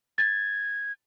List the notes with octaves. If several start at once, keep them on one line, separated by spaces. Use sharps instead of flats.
G#6 A6